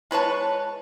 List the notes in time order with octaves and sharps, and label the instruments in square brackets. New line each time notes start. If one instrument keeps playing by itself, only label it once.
[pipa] G#3 B4 C#5 A5